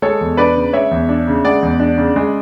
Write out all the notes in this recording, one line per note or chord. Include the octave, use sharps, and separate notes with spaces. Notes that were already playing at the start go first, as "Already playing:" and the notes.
G#3 A4 C#5
E2
D4 B4 D5
C#3
G#3 C#5 E5
E2
D4
C#3
G#3 D5 F#5
E2
D4
C#3
G#3